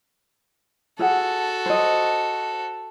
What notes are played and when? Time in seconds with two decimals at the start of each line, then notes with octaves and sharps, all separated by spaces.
0.99 F#4 G#4 A4 E5 F#5
1.66 C5 D#5